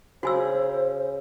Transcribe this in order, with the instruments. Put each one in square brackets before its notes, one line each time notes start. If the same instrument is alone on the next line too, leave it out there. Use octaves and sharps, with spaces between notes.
[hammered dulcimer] C#3 [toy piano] F#4 G#5 E6 [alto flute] C5